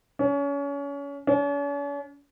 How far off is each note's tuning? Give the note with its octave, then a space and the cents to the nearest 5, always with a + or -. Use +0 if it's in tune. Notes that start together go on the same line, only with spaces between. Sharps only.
C#4 +30
C#4 +45